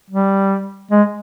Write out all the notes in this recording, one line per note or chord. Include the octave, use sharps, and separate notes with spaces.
G3
G#3